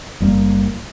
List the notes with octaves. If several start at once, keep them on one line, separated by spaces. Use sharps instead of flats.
F#1 G3 A#3